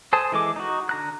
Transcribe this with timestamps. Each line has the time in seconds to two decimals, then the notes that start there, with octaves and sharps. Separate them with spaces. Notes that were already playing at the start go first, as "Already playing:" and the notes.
0.13 A4 C5 G#5 A5 D#6
0.32 E3 G#3 A4 D6
0.56 D#4 F#4
0.89 D3 A#5 F#6